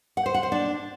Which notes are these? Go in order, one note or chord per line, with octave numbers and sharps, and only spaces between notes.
F#5
C5
F#5
C5
D4